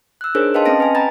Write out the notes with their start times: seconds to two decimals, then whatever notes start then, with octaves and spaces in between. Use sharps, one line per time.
0.21 E6 F#6
0.35 D4 D#4 G#4 A#4 C5 C#5
0.54 B4 D#5 F5 G5 A5 C6
0.65 C4 C#4 D#5 A5 A#6 D7
0.80 B4 G#5
0.95 G5 G#5 A#5 B5 A6